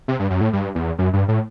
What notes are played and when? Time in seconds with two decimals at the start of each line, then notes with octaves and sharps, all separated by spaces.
0.08 C3
0.19 G2
0.30 F#2
0.41 A2
0.53 G2
0.75 E2
0.98 F#2
1.13 G2
1.28 A2